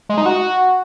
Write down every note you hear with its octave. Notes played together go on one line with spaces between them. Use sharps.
G#3
D#4
F#4